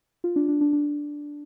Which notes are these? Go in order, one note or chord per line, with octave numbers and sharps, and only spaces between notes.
F4
D4
D4
D4
D4